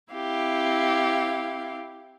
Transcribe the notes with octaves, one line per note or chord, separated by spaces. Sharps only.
C4 E4 G4 F5